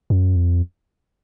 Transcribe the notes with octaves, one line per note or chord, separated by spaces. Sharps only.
F#2
F2